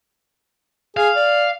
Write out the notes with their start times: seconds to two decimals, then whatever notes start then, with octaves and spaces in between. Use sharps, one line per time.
0.97 G#4 F5
1.16 D5